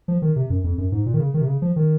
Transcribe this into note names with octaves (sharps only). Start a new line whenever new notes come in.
F3
D#3
C3
F#2
F2
F#2
G#2
A#2
D#3
C#3
D#3
C3
C#3
F3
D#3